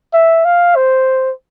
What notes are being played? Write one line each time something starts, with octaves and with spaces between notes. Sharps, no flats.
E5
F5
C5